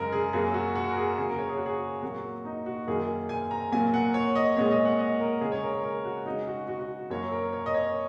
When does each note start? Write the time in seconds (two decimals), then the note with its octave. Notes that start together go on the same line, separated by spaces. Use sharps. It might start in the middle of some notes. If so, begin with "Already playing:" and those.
Already playing: F#2 C#3 G#3 A#4
0.12 G#4
0.33 F#2 F#3 A#3 G#4
0.54 F#4
0.75 F#4
0.89 A#4
0.97 G#4
1.18 C#3 A#3 G#4
1.29 A#4
1.39 C#5
1.49 G#4
1.57 F#4
1.66 G#4
2.03 A#2 F#3 A#3 F#4
2.45 D#4
2.66 F#4
2.87 F#2 D#3 A#3 G#4
3.29 G#5
3.51 A#5
3.72 A#2 F#3 A#3 G#5
3.94 F#5
4.14 C#5
4.35 D#5
4.57 A#2 G#3 C#5
4.71 D#5
4.85 F#5
4.99 D#5
5.20 A#4
5.41 C#3 G#3 G#4
5.52 C#5
5.63 A#4
5.73 A#4
5.83 A#4
6.05 F#4
6.26 C#3 G#3 D#4
6.47 F#4
6.68 F#4
6.79 F#4
7.10 F#2 F#3 A#3 C#5
7.32 A#4
7.53 C#5
7.66 D#5
7.74 C#5